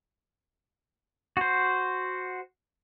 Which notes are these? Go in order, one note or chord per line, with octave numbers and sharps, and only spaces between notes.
F#4 C5